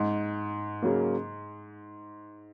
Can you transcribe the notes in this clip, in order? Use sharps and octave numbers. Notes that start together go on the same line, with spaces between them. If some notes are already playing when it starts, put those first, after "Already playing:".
Already playing: G#2
C#3 F#3 A#3